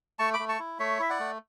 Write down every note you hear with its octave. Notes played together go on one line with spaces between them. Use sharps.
A3 A5 C#6
B5 D6
A3
A5 C#6
E4
A3 C#5 E5
E4 E5
D5 F#5
A3